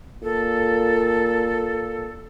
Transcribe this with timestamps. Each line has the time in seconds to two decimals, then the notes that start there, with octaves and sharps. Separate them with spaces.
0.23 A#2 A4